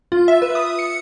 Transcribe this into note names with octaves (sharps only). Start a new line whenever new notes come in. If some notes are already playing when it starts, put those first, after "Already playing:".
F4
E5
B4
D#6
C#7